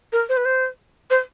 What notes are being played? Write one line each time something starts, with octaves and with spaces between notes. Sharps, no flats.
A#4
C5
B4
C5
C5